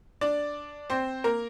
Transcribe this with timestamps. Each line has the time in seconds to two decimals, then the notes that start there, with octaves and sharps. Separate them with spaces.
0.21 D4 D5
0.90 C4 C5
1.24 A#3 A#4